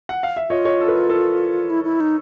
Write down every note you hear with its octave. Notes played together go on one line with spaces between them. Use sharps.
F#5
F5
E5
F4 C#5 D#5
C#5 D#5
A4
B4
A#4
A4 B4
E4
E4
D#4